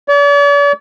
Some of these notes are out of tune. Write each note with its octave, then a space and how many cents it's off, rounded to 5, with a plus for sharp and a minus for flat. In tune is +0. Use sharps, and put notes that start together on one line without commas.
D5 -45